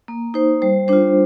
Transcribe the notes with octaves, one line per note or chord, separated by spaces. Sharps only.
A#3
D#4 C5
G3 C5
D4 F4 C5